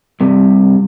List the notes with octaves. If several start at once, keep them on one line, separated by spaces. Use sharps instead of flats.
G2 C3